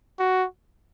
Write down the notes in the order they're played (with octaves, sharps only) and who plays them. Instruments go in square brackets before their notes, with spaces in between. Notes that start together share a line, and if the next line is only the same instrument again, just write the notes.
[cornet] F#4